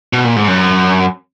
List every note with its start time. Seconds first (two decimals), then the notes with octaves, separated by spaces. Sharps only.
0.13 B2
0.24 A#2
0.36 G#2
0.48 F#2